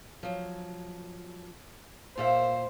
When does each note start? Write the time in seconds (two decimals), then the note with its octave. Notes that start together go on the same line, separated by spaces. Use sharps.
0.23 F3 F#3
2.18 A#2 A#3 C5 E5